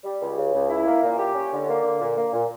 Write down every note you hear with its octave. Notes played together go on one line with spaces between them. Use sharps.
G3
C#2
C#3
C#2
E4
A#3
A#2
G4
C#4
D3
A#3
D3
A#2
A#3
A#2